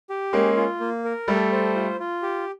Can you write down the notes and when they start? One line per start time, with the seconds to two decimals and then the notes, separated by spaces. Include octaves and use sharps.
0.10 G4
0.33 G#3 A#3 C#4
0.57 F4
0.80 A#3
1.04 A#4
1.28 G3 A3 A4
1.52 C5
1.75 F4
2.00 F4
2.22 G4